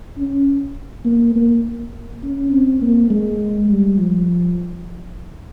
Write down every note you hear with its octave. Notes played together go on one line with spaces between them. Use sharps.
C#4
A#3
A#3
C#4
C4
A#3
G#3
G3
F3